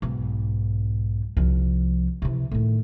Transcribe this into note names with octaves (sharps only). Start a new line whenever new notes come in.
B1 G#2
C2 F3
C3 E3
A2 D#3